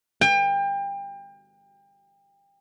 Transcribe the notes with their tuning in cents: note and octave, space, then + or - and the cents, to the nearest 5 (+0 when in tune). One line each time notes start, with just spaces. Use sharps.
G5 +30